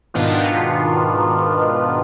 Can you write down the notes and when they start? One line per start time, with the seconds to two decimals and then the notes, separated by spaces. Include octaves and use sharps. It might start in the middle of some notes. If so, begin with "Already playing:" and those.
0.14 G#2 B2 D#3 B3 D4 F4